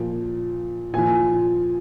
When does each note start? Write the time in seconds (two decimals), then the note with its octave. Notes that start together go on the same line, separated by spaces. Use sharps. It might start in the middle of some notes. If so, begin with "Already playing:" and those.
Already playing: A#2 F3
0.94 A#2 F3 G#5